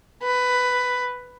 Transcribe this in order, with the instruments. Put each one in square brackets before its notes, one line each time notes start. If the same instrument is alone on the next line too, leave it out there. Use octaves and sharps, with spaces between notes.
[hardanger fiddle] B4